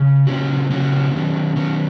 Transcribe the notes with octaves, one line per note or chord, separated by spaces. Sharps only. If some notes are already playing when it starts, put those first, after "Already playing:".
Already playing: C#3
C#3 E3 G#3 C#4 F#4
C#3 E3 G#3 C#4 F#4
D#3 F#3 C#4
D#3 F#3 C#4